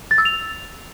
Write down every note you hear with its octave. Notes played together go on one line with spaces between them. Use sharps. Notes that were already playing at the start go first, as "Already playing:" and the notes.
A6
E6
F7